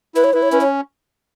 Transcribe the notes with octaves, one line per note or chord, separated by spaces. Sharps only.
E4 B4
C#5
E4 B4
C#5
C#4 B4
C#5